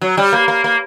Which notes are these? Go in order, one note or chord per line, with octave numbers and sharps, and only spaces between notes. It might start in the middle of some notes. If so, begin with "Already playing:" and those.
F#3
G3
A#3
A#3
A#3